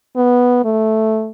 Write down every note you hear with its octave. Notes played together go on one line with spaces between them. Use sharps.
B3
A3